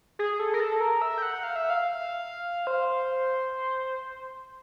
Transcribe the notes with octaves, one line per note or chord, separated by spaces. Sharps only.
G#4
A4
A#4
A4
A#4
E5
G5
F#5
F5
E5
F5
C5